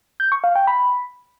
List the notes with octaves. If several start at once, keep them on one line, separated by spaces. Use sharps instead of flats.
G6
C#6
F5
G5
B5